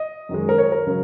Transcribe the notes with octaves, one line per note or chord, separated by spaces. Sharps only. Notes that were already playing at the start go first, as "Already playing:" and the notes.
Already playing: D#5
F#2 D#3 G#3
A#4
C#5
A#4
C#3 F#3